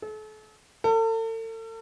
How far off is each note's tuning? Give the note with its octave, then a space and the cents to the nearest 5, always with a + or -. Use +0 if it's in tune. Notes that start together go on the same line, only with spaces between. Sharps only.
A4 -40
A4 +40